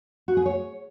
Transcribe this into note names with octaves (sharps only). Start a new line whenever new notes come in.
F#4
G#4
C#5